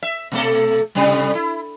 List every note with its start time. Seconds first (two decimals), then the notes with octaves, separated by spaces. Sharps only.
0.03 E5
0.32 B2 A3 A4
0.95 A2 C3 G3
1.35 E4